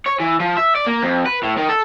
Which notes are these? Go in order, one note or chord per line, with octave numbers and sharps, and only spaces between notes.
C#5
E3
F3
E5
D5
A#3
F2
B4
A2
D#3
A4